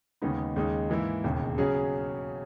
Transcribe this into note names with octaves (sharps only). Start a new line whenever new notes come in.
D#2 C#3 G#3 B3 D#4
D#2 C#3 G#3 D#4
G#2 E3 A#3 E4
E1 D#2 C#3
C#3 F#3 C#4 G#4